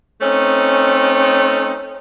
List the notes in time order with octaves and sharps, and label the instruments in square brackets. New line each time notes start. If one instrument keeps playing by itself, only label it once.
[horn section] A3 C4 C#4 D#4